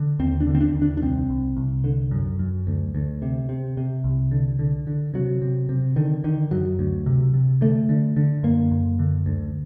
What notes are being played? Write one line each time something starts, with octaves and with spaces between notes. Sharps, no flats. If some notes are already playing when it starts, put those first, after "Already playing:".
Already playing: D3
D#2 C4
D4
D3
C4
D4
D#2
D4
D4
C2 C4
C2
C2
D3
F#2
F#2
D2
D2
C3
C3
C3
C2
D3
D3
D3
C3 F#3
C3
C3
D3 D#3
D3 D#3
F#2 F#3
D2
C3
C3
D3 A3
D3
D3
F#2 A#3
F#2
D3
D2